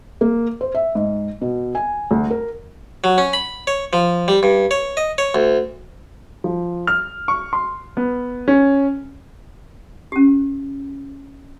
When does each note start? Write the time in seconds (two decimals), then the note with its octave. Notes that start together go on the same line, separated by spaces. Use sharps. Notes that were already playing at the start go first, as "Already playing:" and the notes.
0.21 A#3
0.61 C5
0.75 E5
0.95 G#2
1.41 B2
1.75 G#5
2.11 D2
2.30 A#4
3.04 F#3
3.18 C#4
3.33 B5
3.67 C#5
3.93 F3
4.28 G3
4.43 G2
4.71 C#5
4.97 D#5
5.18 C#5
5.35 D2
6.44 F3
6.87 F6
7.28 C#6
7.53 C6
7.97 B3
8.48 C#4
10.12 C#4 G4